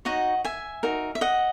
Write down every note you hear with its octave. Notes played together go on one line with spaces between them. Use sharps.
D#4 F#4 C#5 D#5 F#5
E5 G#5
D#4 F#4 A#4
E5
D#5 F#5